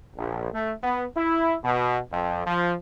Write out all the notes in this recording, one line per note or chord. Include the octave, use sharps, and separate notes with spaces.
A#1
A3
B3
E4
B2
F2
F3